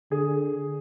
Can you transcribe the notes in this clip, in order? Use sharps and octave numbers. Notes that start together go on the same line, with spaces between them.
D3 G#4